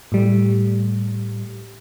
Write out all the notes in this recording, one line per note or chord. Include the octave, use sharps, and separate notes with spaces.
A2 G3 A3